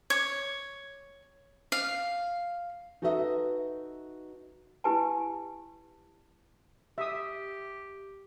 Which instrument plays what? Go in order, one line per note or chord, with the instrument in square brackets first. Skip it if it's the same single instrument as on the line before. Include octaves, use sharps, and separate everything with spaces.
[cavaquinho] C#5
F5
[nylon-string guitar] D#4 F#4 A4 B4 D#5 E5
[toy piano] E4 G4 B4 G#5 A5
[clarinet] G4 [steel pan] E5 D#6